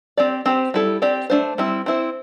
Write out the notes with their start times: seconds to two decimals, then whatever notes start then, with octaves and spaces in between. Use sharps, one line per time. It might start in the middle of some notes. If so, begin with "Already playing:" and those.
0.17 C4 G4 D5
0.46 C4 G4 C5
0.74 G3 E4 A4
1.02 C4 G4 D5
1.30 A3 D4 C5
1.58 G3 C4 E4
1.86 C4 E4 C5